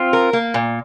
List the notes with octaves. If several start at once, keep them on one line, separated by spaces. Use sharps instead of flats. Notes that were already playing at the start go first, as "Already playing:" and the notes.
Already playing: C4 F4
A#4
A#3
A#2